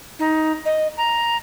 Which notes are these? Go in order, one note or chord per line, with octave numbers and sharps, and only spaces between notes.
D#4
D#5
A#5